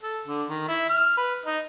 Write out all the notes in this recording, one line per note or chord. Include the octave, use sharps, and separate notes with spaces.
A4
D3
D#3
E4
F6
B4
D#4